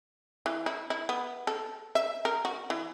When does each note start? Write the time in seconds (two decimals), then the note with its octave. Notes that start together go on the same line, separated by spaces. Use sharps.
0.46 E3
0.66 E4
0.90 E4
1.09 B3
1.47 A4
1.95 E5
2.25 A#4
2.45 F#4
2.70 E3